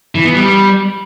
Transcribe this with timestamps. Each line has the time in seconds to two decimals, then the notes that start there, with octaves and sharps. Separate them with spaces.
0.15 E3
0.25 B3
0.35 G3